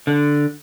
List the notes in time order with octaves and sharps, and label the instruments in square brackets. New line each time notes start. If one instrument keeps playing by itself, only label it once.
[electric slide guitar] D3